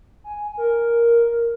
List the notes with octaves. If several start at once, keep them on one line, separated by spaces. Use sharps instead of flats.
G#5
A#4